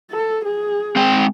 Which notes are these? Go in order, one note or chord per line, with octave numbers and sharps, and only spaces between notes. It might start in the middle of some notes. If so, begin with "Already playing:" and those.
A4
G#4
G#3 C4 G5